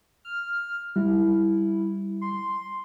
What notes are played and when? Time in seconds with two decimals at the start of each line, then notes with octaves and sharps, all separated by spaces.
0.25 F6
0.96 G3 E4
2.21 C6